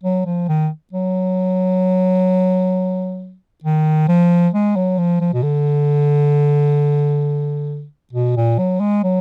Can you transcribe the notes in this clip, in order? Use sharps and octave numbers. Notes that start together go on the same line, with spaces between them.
F#3
F3
D#3
F#3
D#3
F3
G#3
F#3
F3
F3
B2
D3
B2
A#2
F#3
G#3
F#3